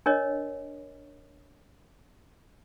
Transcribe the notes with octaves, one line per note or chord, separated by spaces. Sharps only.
D4 A#4 C#5 D#5